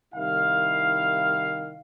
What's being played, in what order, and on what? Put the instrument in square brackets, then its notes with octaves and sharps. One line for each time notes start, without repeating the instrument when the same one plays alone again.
[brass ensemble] C2 D#3 E4 F5